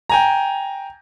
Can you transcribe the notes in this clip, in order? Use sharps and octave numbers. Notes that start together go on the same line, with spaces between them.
G5 G#5 A#5